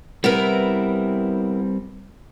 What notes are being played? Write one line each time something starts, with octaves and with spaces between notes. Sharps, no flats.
G3 B3 C4 E4 A#4